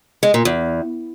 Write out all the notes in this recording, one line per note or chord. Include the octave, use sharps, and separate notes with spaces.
G#3
A#2
E2